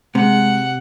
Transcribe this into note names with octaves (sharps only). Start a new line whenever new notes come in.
C3 G#3 F#5